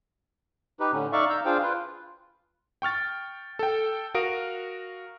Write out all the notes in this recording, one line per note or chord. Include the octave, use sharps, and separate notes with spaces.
D#4 G4 B4
A2 D3 C#4
D#4 D5 E5 F5 C#6
F5 A#5 E6 G6
D4 F4 G#4 C5 F5 G5
F4 B4
G5 C#6 F6 A6
A4 G5
F#4 A#4 F5 D#6 D7